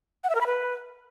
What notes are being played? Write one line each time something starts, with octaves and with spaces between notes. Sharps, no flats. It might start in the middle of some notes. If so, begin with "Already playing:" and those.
F#5
E5
A#4
B5
B4